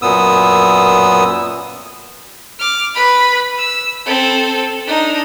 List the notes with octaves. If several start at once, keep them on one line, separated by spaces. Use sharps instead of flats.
F#2 A#2 B3 D#6 E6
D6 F6
B4 B5
E6
C4 A4
D4 D#4